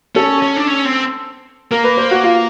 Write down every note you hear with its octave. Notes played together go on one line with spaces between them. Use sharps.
C#4 A4
C#4
D4
C#4
C4
A#3 A#4
B4
C5
F#4
F4